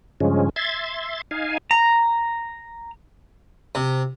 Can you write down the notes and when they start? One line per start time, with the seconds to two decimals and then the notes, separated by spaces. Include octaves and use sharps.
0.21 G2 C#3 F3 G#3 C#4
0.56 E5 C6 G#6 A6
1.31 D#4 F5 G#5
1.71 A#5
3.75 C3